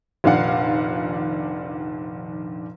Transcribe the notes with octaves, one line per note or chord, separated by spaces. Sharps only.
F1 A#1 D#3 D4 F5 F#5